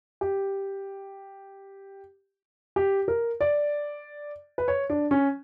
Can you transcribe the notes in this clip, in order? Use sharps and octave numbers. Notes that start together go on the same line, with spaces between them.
G4
G4
A#4
D5
B4
C#5
D4
C#4